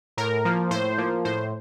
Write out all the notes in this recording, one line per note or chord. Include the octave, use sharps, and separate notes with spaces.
A2 A#4
F3 A#3
A2 C5
F3 A#3
A2 C5